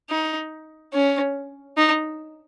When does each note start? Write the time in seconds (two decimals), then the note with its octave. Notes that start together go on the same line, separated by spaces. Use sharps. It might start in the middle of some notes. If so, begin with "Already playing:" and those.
0.10 D#4
0.93 C#4
1.77 D#4